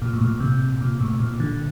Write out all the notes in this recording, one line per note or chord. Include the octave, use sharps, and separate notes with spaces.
A#2
A2
A#2
C3
A#2
A2
A#2
D3